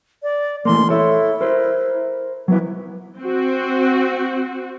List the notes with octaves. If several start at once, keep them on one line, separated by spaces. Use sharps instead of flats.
D5
E3 A3 A#3 C6
E4 A4 C#5
A#4 C5
F#3 B3 E4
C4 F#4